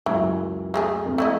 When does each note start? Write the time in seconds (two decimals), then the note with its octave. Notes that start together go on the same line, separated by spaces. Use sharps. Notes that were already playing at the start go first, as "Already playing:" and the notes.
0.06 C#2 F#2 E3
0.74 G#3 A3 G#4
1.05 F2 A#4
1.18 A3 E4 D#5